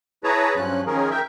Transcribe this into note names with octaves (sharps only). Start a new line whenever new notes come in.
E4 G#4 B4 C#5 A5 A#5
G2 F3 F#3 C#4 F#6
D#3 F3 C#4 G#4 A#4
A#4 E5 G5